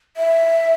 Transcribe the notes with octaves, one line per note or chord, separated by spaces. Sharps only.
E5